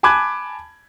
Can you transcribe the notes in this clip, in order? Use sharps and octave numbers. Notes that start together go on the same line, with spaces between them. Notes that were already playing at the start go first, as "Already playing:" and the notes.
G#5 A5 B5 D6 F#6 G#6